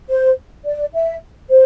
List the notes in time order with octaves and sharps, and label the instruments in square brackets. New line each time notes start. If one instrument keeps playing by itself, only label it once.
[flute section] C5
D5
E5
C5